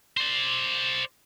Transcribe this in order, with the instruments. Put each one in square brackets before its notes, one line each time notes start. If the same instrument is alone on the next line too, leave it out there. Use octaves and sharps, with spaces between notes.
[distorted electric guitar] C5 D5